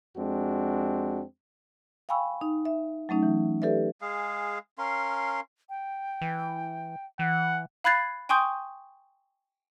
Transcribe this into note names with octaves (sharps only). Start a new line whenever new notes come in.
F2 G#3 C4 D4 F#4
F5 G5 G#5 B5 C#6 E6
D#4
E5
F#3 A3 C#4 D#4
E3
G4 A4 B4 D5 E5
G#3 G#4 F5
C#4 A#4 F5 C6
G5
E3
E3 F#5
F5 B5 F#6 G#6 A6 C7
G5 G#5 C6 C#6 D#6 G6